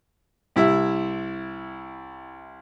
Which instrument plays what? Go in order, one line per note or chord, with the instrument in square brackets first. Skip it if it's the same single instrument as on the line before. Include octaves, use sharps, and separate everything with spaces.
[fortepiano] C2 E4 E5